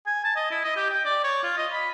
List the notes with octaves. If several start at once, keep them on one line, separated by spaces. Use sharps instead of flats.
G#5
A5
D#5
E4
D#5
G4
G5
D5
C#5
F4
D#5
B5